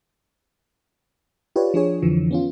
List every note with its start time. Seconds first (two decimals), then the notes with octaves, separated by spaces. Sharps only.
1.56 F4 G4 B4 C#5 D5
1.74 F3 D4 G#4 C#5
2.02 F2 D3 E3 F3
2.31 B3 C#4 F4